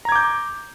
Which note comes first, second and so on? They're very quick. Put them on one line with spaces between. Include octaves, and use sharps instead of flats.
A#5 G#6 D6 G6